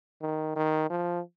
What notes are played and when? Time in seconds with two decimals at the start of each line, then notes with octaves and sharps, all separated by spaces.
0.22 D#3
0.56 D#3
0.90 F3